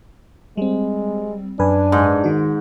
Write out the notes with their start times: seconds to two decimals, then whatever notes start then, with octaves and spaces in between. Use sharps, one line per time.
0.57 G3 G#3 C4
1.59 F#2 D4 B4 G#5
1.92 G#2
2.24 D#3 F#4